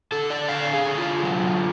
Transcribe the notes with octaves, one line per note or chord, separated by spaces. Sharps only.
D3 A4
D5
D3 F5
G#4
D3
F4
F#3